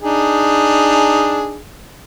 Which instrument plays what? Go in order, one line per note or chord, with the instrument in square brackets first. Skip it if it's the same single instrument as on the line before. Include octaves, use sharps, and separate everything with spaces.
[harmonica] D4 D#4 G#4